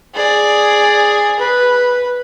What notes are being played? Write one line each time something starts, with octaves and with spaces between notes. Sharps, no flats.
G#4 D5
B4